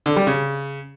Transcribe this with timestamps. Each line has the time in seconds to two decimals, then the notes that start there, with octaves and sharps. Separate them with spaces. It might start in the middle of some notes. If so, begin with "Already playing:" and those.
0.06 D3
0.16 G3
0.27 C#3